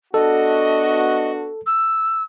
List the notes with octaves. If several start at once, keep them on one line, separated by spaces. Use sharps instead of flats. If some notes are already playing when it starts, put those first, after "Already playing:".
B3 D4 F#4 A4 D#5
E6